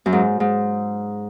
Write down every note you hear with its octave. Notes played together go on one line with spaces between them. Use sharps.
F#2
G#2
G#2